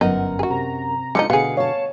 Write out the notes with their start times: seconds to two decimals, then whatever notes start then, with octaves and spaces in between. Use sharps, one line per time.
0.01 G1 F#2 B3 D#4 A#4 F#5
0.39 F#4 G#4
0.50 C3 A#5
1.15 D3 F3 G#3 D#4 C#7
1.30 B2 D3 B3 G#4 F5
1.57 C#5 F5 A5